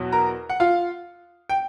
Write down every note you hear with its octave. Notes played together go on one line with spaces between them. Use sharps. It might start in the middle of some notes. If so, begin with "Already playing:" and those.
Already playing: E2 B2 F#3
A#4 A#5
F#5
F4 F5
G5